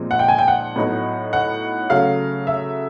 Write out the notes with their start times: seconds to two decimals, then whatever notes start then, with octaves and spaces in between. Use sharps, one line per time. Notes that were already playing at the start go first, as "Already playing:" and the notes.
Already playing: A#2 F3 G#3 C4 D#4
0.11 F#5
0.19 G5
0.28 G#5
0.38 G5
0.48 F#5
0.76 A2 F#3 B3 D#4
1.33 F#5
1.90 C#3 F#3 A3 F5
2.47 E5